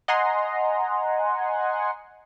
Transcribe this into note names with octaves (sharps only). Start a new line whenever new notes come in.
D#5 F#5 G#5 A#5 C6